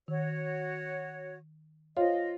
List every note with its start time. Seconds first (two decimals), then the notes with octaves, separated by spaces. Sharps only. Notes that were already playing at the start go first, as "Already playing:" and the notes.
0.08 D#3 F#4 C#5
1.97 F4 C5 C#5 D#5